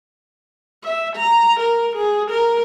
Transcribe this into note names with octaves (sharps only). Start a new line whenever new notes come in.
E5
A#5
A#4
G#4
A#4